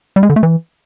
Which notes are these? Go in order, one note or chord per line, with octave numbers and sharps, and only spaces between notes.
G3
G#3
D3
A3
E3